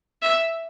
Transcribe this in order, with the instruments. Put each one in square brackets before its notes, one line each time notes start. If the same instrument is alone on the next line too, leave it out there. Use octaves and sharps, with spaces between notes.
[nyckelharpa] E5